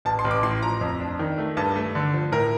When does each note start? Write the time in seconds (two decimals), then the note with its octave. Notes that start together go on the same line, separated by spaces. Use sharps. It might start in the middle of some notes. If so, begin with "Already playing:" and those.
0.05 A1 A5
0.19 C6
0.24 A1
0.31 D6
0.43 A2 C6
0.62 F3 A#5
0.81 F2
1.00 D4
1.19 D#3
1.38 A3
1.57 G2 A5
1.76 A3
1.95 D3
2.14 F3
2.32 A2 A#4